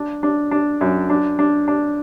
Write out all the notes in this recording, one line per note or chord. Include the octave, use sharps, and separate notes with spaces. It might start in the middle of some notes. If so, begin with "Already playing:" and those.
Already playing: D4
D4
D4
F#2
D4
D4
D4